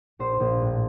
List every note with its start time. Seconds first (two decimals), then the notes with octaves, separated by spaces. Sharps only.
0.19 A#1 C5
0.40 A#1
0.61 A2